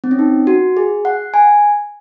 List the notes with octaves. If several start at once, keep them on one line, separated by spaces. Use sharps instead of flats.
C4
C#4
D#4
F#4
G#4
F#5
G#5